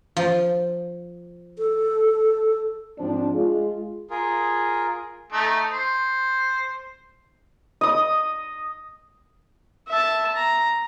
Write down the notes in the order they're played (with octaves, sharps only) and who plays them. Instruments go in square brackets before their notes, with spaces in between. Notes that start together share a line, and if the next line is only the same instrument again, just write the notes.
[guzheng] F3
[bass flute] A4
[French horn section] G#2 F3 C4 D4
G#3 F4 G#4
[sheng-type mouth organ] F4 G#4 A#4
[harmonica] A3 D#4
C5
[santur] D#5 D#6
[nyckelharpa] E5 A5
A#5